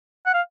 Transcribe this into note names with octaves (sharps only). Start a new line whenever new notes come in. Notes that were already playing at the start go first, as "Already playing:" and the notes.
F#5
F5